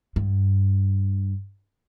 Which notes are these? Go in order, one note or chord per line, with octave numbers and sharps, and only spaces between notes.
G2